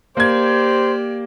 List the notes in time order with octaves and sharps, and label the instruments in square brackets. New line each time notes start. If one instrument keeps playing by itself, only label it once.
[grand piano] A#3 G#6 [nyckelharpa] G4 D5 [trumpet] C5